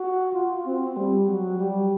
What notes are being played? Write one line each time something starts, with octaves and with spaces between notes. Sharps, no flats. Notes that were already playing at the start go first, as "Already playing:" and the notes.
Already playing: F#4
F4
C4
G3
F#3
G3